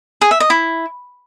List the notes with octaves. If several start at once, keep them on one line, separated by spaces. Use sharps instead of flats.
G#4
E5
D#5
E4